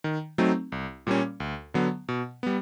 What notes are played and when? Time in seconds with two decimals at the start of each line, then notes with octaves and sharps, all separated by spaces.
0.04 D#3
0.38 F#3 A3 C4 D#4
0.72 C2
1.07 A#2 G3 A#3 C#4
1.40 D2
1.74 D3 F#3 B3
2.08 B2
2.43 G3 B3